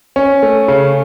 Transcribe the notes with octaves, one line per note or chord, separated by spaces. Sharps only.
C#4
A3
C#3